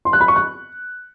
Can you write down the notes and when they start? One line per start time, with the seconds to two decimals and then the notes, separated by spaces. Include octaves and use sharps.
0.05 C6
0.13 F#6
0.21 B5
0.28 C#6
0.36 F#6